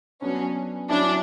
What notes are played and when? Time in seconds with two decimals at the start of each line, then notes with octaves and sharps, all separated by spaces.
0.22 F#3 B3 C#4 D4
0.90 F#3 C#4 D4 E4